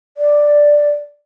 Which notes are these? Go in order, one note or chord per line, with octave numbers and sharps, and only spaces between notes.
D5